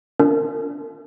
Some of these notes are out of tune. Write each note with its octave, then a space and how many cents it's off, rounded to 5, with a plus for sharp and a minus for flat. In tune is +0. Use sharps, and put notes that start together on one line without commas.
D4 -35 F4 +0 A#4 -35